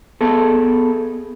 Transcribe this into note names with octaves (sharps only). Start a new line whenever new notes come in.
B3 G#4 A4